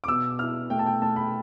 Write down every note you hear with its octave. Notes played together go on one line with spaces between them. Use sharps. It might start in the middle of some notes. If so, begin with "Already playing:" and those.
D6
B2 E6
E4 F6
A3 G5
A5
G5
A3 A5
B5